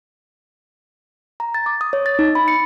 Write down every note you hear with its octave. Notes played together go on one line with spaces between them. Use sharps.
A#5
A6
D6
D#6
C#5
A6
D#4
B5
C#7